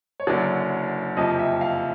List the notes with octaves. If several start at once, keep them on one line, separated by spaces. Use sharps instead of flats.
C#5
F#1 F#2 D3 F#3 D5
F#1 F2 C3 F3 D#5
E5
F5